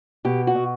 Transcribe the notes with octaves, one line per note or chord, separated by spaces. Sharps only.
B2 G4
F#4
B2